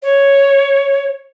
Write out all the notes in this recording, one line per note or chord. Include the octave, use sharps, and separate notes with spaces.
C#5